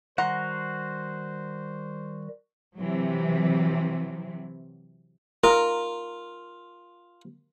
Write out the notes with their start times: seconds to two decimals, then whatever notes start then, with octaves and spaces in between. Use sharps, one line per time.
0.18 D#3 G3 F#4 C5 F#5 A#5 C6
2.76 C3 E3 F#3
5.44 F4 A#4